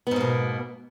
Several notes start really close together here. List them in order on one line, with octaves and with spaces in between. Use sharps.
B3 G#2 A#3 B2